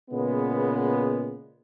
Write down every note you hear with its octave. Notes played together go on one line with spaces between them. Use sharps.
A#2 C#3 G#3 B3